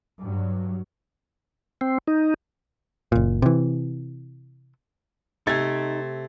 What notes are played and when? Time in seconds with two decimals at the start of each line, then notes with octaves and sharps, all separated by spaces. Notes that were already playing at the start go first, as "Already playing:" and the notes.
0.23 G2 F#3
1.81 C4
2.08 D#4
3.12 F#1 A#2
3.42 C3 E3
5.47 C3 A3 C4 D#4 E6 G#6 A6